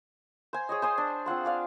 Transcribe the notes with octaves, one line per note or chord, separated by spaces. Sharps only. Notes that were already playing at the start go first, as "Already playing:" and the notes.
C5 G#5
G#4 C#5 D#5
C5 G#5 D#6
D4
C4 F4 F#5 C6
G#4 D5 F5